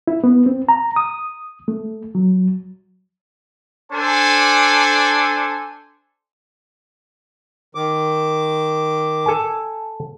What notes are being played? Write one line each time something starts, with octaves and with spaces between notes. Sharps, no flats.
E4
B3
C4
A#5
D#6
A3
F#3
D4 A4 C5 G#5
D#3 D6
A4 G#5